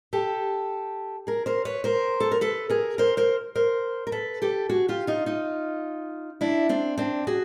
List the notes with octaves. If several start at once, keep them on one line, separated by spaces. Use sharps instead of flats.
G4 A4
G#4 A#4
A#4 C5
B4 C#5
A#4 C5
A4
A#4
A4 B4
G#4 A#4
A#4 C5
A#4 C5
A#4 C5
A#4
A4 B4
G4 A4
F#4 G#4
F4 G4
D#4 F4
D#4 F4
D4 E4
C4 D4
C4 D4
F#4 G#4